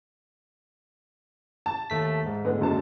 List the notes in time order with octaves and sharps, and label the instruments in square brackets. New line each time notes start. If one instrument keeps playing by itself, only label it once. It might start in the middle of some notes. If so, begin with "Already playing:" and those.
[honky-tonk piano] A5
[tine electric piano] D#2 A3 B6
G#2
[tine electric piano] A2 D3 G#3 [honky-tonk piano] B3
[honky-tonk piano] F#1 F#2 A5